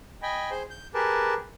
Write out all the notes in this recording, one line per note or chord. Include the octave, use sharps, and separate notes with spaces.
D#5 G5 G#5 B5
G#4 C5 C6
G6
G4 G#4 A#4 B4 A5